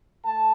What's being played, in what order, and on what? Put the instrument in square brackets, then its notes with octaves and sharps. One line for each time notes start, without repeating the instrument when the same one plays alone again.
[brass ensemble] A3 A5